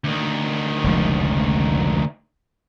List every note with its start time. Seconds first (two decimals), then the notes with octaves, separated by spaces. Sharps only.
0.04 D2 D#3
0.84 F1 C#2 F3